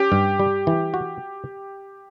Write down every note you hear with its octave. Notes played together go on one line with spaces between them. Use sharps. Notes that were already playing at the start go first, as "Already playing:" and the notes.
Already playing: C#4 G4
G2
G3
E3
F#4